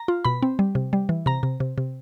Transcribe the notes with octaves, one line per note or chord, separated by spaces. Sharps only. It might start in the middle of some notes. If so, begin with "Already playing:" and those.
Already playing: A#5
F4
B2 B5
C4
G3
C3
G3
E3
C3 A#5
C3
C3
C3